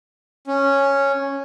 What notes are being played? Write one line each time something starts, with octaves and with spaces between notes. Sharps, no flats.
C#4